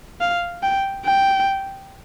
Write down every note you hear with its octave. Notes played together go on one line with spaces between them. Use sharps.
F5
G5
G5